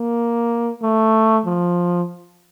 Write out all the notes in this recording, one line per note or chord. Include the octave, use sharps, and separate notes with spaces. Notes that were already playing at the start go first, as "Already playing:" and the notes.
Already playing: A#3
A3
F3